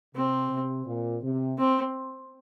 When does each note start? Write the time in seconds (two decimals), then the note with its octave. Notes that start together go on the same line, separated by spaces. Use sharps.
0.15 C3 C4
0.50 C3
0.86 A#2
1.23 C3
1.58 C4